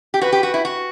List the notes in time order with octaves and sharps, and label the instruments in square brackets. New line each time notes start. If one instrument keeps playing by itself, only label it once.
[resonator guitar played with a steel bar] G4
[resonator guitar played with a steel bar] F#4 [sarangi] B4
[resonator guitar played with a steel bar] G4
F#4
E4
F#4